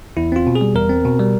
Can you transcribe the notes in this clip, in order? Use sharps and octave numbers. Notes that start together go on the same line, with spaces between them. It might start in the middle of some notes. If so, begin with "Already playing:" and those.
E2 E4
C4 F4
B2
G#4
G3
E2 A#4
C4
B2
G3